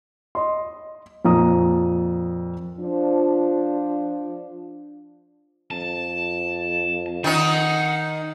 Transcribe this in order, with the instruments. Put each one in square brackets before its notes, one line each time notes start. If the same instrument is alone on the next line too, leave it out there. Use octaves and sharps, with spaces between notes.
[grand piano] D#5 C6
F2 A#2 A#5 D#6
[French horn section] F3 D4
[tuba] F2 [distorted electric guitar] A5
[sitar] D#3 D#4 [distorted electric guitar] F#5 A5